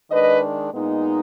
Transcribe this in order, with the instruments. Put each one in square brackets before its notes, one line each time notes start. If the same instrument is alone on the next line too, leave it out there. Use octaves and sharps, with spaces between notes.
[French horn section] D#3 G#3 D4 B4 D#5
A#2 G#3 B3 D#4